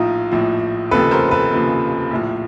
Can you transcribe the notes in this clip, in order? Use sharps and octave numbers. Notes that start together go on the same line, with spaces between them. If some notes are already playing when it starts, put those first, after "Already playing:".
Already playing: A#1 A2 F3 D#4 F4
A#1 A2 F3
F1 D#2 C#3 F3 A4 B4
A#4 C5
A4 B4
F1 D#2 C#3 F3
A#1 A2 F3